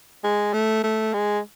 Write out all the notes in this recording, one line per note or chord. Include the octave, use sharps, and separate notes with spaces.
G#3
A3
A3
G#3